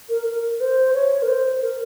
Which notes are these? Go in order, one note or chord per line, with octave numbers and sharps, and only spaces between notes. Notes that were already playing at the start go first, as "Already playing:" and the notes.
A#4
A#4
C5
C#5
A#4
C5
A#4